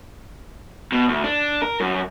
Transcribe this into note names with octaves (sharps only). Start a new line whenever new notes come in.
B2
D2
D4
A#4
F#2